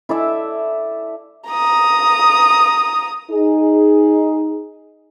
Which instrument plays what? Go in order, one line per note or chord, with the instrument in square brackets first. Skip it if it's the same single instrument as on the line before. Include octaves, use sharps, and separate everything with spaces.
[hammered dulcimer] E4 A4 D5 E5
[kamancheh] A#5 D#6
[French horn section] D#4 G#4